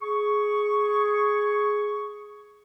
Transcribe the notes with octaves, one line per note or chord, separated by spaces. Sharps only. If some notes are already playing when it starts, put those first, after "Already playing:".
G#4 C#6